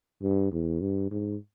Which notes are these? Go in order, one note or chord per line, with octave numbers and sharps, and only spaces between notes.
G2
E2
G2
G#2